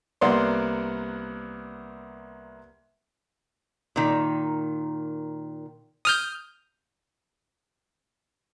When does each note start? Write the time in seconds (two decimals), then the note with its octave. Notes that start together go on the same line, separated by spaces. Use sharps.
0.21 C2 A#3 B3 D5 F#5 C6
3.96 A#2 D#3
6.05 D#6 F6 G6